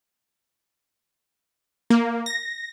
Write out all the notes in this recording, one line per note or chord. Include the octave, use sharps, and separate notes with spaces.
A#3
A#6